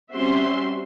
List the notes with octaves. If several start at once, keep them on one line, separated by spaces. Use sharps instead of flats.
G3 C4 C#4 F#4 E5 C6